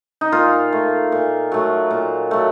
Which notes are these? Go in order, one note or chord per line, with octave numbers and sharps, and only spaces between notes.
D#4
A#2 F4
A3
A#2
F#3 A3
A#2
F#3 A3